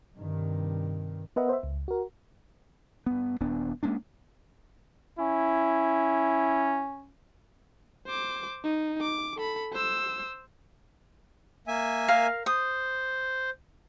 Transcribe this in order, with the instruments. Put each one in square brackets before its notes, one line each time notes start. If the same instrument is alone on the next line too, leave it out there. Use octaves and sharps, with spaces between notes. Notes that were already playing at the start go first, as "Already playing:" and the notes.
[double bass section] G2 C3 D#3
[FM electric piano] B3 A#4 B4 D#5 E5 F#5
C5 E5
C#2
F#4 A#4
[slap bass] G2 B3
D#1 B3 D4
G#3 A#3 C#4 D4
[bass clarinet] C#4 [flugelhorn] E4
[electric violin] C5 D6
D#4
D6
A4 B5
C5 E6
[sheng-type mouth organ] A#3 E5 G#5
[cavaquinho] A#4 F5
[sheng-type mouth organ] C5 [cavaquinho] D#6